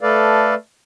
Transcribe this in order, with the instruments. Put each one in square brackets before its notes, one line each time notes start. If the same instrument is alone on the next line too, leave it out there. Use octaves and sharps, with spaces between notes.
[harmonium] A3 A4 B4 D5 F5